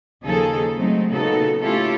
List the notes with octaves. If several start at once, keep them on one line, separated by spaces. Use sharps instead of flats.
D#2 C#3 F3 D#4 G#4 A4
F#3 G#3 A3 C4 D#4
A#2 C#3 B3 D#4 F#4 A4
A3 C#4 E4 F4 G4 A4